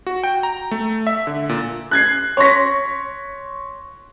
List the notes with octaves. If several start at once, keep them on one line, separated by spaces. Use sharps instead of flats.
F#4
G5
A#5
A3
E5
D3
A#2
F#6 G#6 C7
C#5 C6 C#6 A#6 B6